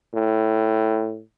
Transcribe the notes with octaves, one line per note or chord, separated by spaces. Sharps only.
A2